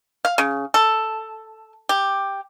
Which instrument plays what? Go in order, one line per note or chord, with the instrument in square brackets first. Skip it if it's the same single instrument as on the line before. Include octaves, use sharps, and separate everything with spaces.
[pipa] F5
C#3
A4
G4